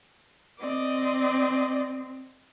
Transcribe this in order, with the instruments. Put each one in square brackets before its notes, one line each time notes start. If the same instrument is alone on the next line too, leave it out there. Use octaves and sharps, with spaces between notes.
[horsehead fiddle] C4 [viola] D5 D#5